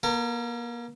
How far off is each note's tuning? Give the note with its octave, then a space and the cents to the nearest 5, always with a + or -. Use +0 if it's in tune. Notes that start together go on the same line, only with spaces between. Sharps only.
A#3 +35 A#4 -40